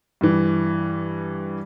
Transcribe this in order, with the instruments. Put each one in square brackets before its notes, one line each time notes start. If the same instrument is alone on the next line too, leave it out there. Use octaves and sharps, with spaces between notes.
[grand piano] G2 E3